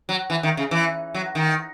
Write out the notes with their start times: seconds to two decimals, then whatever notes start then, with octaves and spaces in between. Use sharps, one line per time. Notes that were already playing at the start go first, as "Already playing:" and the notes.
0.09 F#3
0.30 E3
0.43 D#3
0.57 C#3
0.71 E3
1.14 F#3
1.35 D#3